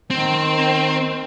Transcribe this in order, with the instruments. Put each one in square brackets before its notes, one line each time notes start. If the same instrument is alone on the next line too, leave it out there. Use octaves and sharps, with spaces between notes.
[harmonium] D#3 [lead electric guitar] C4